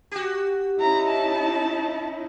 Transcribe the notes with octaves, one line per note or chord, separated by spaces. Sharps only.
F#4 G4
C#4 D#4 E4 A#5
A5